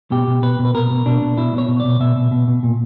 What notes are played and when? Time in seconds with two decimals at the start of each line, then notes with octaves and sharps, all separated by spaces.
0.11 B2 G4
0.27 B2
0.42 B2 B4
0.59 B2
0.65 B4
0.74 B2 A#4
0.91 B2
1.06 B2 D4
1.21 B2
1.37 B2 E4
1.53 B2 C#5
1.68 B2
1.80 B2 D5
2.00 B2 E5
2.16 B2
2.31 B2
2.48 B2
2.63 A#2